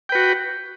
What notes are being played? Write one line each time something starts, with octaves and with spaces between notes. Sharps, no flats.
F#4 B4 G5